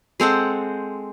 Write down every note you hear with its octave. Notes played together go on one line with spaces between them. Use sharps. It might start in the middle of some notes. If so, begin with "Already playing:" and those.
G#3 C4 A4 F#5